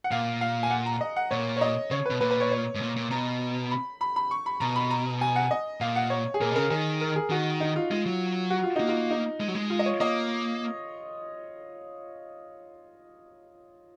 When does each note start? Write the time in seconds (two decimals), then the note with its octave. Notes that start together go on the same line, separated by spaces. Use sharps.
0.04 F#5
0.11 A#2 F5
0.41 F5
0.63 G#5
0.70 F#5
0.86 A#5
1.01 D#5
1.16 F#5
1.31 A#2 C#5
1.56 C#5
1.61 D#5
1.91 C#3 C#5
2.06 B2 B4
2.21 A#2 B4
2.31 B4
2.40 C#5
2.52 C#5
2.75 G#2
2.81 A#2
2.96 A#2
3.11 B2 A#5
3.71 B5
4.01 B5
4.16 B5
4.31 C#6
4.46 B5
4.60 B2 A#5
4.76 B5
4.90 A#5
5.21 G#5
5.36 F#5
5.51 D#5
5.81 A#2 F5
5.96 F#5
6.10 C#5
6.34 G#4
6.41 A#2 A#4
6.51 B2
6.55 C#3 A#4
6.70 D#3 G#4
7.01 A#4
7.16 G#4
7.30 D#3 F#4
7.60 D#4
7.76 F4
7.91 G#3 F4
8.06 F#3
8.50 F#4
8.63 F4
8.76 A#3 D#4
8.89 F4
9.11 D#4
9.40 G#3
9.48 F#3
9.55 G#3
9.70 F4
9.79 D#5
9.86 C#5
10.00 A#3 D#5